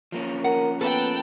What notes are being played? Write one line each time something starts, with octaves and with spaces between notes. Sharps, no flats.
F3 A#3 C#4
A#4 F#5
B3 A4 B4 G5 A5 F#6